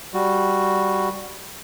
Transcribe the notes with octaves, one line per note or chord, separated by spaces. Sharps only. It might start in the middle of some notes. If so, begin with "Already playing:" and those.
G3 F#4